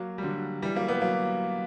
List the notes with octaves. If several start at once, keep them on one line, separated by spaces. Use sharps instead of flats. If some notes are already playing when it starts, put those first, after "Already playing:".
Already playing: F#3 A#3
G3
D3 F#3
E3 G3
F#3 A#3
G3 B3
F#3 A#3